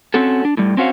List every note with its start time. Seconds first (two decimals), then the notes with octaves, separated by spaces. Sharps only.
0.14 C4 C#4 F#4 A4
0.45 D4
0.57 A2 G3
0.77 C4 C#4 F#4 C5 F5